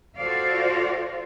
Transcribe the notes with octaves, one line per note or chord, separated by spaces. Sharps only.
F4 F#4 A4 C5 D5 F5